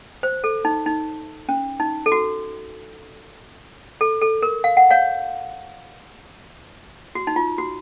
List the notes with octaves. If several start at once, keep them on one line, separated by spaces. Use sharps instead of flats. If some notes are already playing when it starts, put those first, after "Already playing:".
C5
A4
D#4
D#4
C#4
D#4
A4
F#4
A4
A4
A#4
F5
F#5
C#5 F5
F#4
D#4
F4
F#4